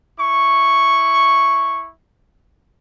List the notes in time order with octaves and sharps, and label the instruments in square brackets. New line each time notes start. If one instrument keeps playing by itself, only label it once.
[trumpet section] E4 C#6